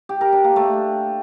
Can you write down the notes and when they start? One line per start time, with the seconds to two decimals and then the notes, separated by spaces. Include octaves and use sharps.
0.09 G4
0.21 A#4
0.33 D4
0.44 A#3
0.56 A3